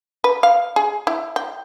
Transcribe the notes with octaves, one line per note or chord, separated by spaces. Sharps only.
B4
F5
G#4
E4
G5